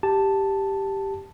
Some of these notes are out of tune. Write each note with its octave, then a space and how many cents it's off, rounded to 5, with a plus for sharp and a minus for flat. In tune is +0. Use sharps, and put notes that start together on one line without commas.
G4 +0 A5 +0